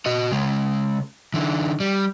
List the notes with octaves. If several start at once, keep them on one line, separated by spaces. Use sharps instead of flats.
F#4 D#5
C#3 G#3
D3 E3
G3